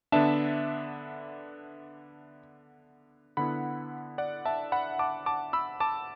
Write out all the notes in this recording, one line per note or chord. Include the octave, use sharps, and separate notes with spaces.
D3 B3 D4 E5 A5
D3 B3 E4 F#5 B5
D5 F#5
E5 A5
F#5 B5
A5 D6
A5 D6
B5 E6
A5 D6